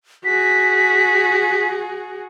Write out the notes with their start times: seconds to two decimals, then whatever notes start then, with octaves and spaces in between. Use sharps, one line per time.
0.25 F#4 G#4 B6